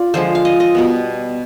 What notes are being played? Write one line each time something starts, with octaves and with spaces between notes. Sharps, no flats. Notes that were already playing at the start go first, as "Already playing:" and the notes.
Already playing: F4 D5
D3 F3 G#3 C5
F5
D#5
D#5
B2 G3 B3